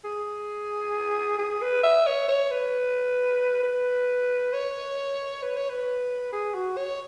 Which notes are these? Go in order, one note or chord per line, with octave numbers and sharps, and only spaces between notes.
G#4
G#4
B4
E5
C#5
C#5
B4
B4
C#5
B4
C#5
B4
G#4
F#4
C#5